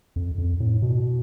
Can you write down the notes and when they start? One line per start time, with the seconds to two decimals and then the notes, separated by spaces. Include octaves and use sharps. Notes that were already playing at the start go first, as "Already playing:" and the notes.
0.16 F2
0.38 F2
0.60 A2
0.82 B2